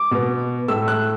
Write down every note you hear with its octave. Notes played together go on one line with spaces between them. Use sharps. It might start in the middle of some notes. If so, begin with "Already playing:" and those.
Already playing: D6
B2 B3
A2 A3 E6
F#6